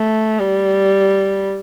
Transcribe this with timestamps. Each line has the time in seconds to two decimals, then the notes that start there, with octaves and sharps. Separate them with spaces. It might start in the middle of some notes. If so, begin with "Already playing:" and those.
Already playing: A3
0.40 G3